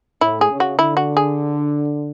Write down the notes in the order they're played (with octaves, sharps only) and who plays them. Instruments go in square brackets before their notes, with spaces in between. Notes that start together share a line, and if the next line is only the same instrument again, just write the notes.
[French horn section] A2 [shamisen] E4
[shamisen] G#4
[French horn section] C#3
[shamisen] F#4
[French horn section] D3 [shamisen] E4
[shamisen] F#4
G#4